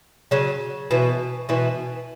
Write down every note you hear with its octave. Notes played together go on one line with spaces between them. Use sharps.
C#3 F#3
B2 E3
B2 E3